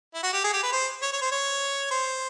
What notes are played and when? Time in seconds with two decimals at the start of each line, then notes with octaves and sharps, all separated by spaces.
0.14 E4
0.23 F#4
0.33 G4
0.44 G#4
0.53 G4
0.63 B4
0.72 C5
1.02 C#5
1.13 C#5
1.22 C5
1.32 C#5
1.91 C5